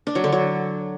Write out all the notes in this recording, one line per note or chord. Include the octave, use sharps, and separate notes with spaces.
D4
F#3
D3
F#3